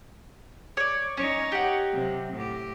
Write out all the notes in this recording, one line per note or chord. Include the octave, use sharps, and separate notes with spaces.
C#5 D5
C#4 D#4 C#5
G4 F#5
C3 F#3
A2 G4